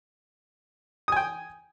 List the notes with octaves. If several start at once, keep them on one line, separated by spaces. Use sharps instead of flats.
G5 G#5 D#6